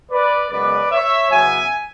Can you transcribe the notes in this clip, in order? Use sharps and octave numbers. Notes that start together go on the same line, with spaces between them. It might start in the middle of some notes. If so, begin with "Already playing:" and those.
B4 D5
F#2 C#3 G#3 B3 B4 D5
C#5 E5
E2 C#3 F#3 B3 E5 G#5